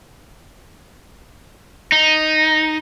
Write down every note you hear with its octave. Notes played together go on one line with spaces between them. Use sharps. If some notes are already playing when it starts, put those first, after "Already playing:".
D#4